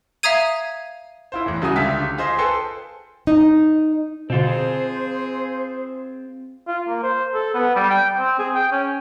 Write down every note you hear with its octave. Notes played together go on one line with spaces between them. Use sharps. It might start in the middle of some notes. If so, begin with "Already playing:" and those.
E5 F5 A#5 D#6 G#6 D#7
E4 F4 C5
E2 A2
C2 C#3 F#3 F#4 G#5 D#6
C#2 D3 F4 G4 E5 B6
F4 G#4 C5 D#5
A4 B4 C5 G5 G#5
D#4
B2 D3 C4 F4 G#4 C5
F4
A#3
C5
A4
B3
G3
G5
C4
G#4
G5
C#4